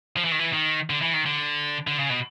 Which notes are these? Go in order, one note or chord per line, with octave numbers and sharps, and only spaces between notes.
F3
E3
D#3
E3
D#3
D3
E3
D#3
D3
D3
C#3
B2